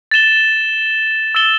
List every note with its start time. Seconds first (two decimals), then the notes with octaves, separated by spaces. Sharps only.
0.11 A6 E7 G7
1.35 E6 A6 E7 G7